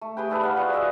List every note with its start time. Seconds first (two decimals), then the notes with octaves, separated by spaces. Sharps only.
0.01 A3
0.17 G4 G#4 B4 G5
0.30 G3 A4 B4 D#6
0.43 D5 F5 F#5
0.56 F4 F#4 G#4 B4
0.73 D#5 E5 F#5